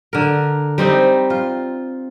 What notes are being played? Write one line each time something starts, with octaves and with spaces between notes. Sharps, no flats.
D3 A#4
G3 C4 D#4
F4